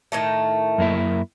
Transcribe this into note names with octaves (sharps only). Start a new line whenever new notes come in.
A2 D#3 A3
F#2 A#3 E4